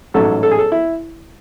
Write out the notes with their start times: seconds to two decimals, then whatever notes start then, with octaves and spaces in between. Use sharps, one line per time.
0.14 A1 G#2 F#3 A3 C#4 A4
0.43 A4
0.51 G#4
0.59 A4
0.72 E4